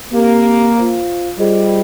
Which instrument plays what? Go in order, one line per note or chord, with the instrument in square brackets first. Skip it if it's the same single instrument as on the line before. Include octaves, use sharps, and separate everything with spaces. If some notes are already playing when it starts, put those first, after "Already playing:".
[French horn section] A#3 [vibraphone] C4 G4 A#4 F5
[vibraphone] F4 C5 F5
[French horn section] G3 [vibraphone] F4 G#4 C5 D#5